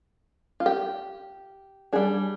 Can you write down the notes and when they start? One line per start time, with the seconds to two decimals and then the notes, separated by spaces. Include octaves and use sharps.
0.60 F4
0.66 G4
1.93 G3 D4 G#4